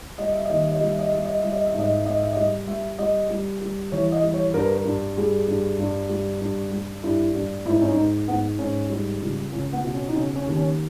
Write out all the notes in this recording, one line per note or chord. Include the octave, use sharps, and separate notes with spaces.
G3 D#5
E5
D#2 D#5
E5
D#5
G3 E5
D#5
G3 E5
D#5
G3 E5
D#5
E5
G#2
D#5
E5
G#2 D#5
E5
G3 D#5
G3 E5
G3 D#5
G3
G3
E3 C#5
D#5
G3
C#5
G2 A#4
B4
A#4
G2
G3 G#4
G2
G2
G3
G2
G3
G2 E4
G2
G#2 E4
D#4
C#4
D#4
G#2
G#2 B3
G#2 C#4
G3
C#2
C#2 C#4
B3
B2
C#4
D#4
C#3 C#4
C#4
D#2
C#4